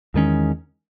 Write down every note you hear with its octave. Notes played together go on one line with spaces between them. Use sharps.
E2 D#3 G#3 C#4